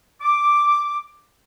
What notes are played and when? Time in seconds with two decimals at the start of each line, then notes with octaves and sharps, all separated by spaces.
0.21 D6